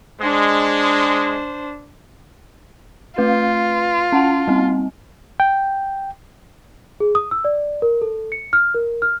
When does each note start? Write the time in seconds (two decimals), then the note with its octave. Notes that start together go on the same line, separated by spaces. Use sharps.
0.20 G#3 D4 C5
3.18 A3 F4 B4
4.13 C#4 F#5 A5
4.48 G3 C4
5.40 G5
7.00 G#4
7.15 D#6
7.31 E6
7.45 D5
7.82 A#4
8.02 A4
8.32 C#7
8.53 F6
8.75 A#4
9.02 F6